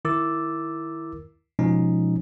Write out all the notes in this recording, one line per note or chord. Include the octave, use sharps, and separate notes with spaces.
D#3 E4 A#4 D6 E6 A6
B2 F3 G#3 C#4 D#4